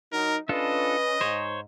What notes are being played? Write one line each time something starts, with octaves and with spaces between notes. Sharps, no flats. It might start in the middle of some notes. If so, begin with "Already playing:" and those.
F#3 D#4 A#4
C#4 D4 F4 A4 B4 D#5
G#2 C5 C#5